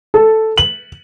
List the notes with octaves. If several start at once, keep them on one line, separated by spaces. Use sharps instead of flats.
A4
F#7